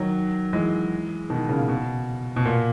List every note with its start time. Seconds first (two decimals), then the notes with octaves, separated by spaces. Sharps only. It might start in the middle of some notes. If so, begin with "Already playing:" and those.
Already playing: D#3 F#3
0.53 E3 G#3
1.30 B2 D#3
1.49 A#2 C#3
1.68 B2
2.36 B2
2.45 A#2